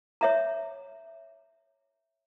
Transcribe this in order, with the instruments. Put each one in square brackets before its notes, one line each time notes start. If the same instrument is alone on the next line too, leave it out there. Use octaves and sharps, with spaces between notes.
[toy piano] C#5 E5 A#5